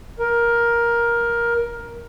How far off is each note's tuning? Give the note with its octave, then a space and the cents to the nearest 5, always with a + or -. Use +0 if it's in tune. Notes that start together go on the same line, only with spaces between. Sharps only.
A#4 +10